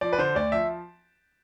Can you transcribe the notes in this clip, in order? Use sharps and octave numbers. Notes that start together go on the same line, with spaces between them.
F3 D5
B4
D3 C5
D2 D5
F3 E5